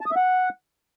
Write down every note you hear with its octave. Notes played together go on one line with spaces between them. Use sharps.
A5
D#6
E5
F#5